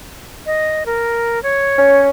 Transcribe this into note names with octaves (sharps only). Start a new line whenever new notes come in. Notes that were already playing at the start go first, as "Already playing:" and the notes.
D#5
A#4
C#5
C#4